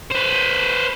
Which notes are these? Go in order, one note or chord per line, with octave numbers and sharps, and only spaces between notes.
B4 C5